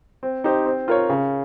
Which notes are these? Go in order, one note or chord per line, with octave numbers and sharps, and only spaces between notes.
C4
D#4 G4 C5
C4
F4 A#4 C#5
C#3